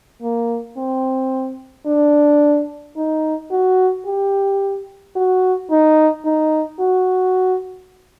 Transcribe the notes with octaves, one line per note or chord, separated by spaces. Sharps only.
A#3
C4
D4
D#4
F#4
G4
F#4
D#4
D#4
F#4